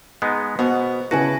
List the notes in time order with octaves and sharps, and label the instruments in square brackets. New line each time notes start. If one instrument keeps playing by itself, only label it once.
[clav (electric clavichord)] G#3 B3 D#4
[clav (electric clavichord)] B2 [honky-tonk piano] B3 [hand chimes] C5
[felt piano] C#3 E4 [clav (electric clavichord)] F#4 [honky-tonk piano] B4 [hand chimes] G#5 A5 A#6